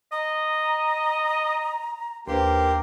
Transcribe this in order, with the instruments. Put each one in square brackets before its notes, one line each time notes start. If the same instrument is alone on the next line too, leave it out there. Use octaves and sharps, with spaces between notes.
[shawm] D#5 [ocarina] A#5
[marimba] D#2 D4 C5 [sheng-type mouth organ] A#3 G4 C6 [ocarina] B4